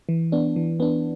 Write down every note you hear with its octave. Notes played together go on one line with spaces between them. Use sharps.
E3
B3 D4
E3
B3 D4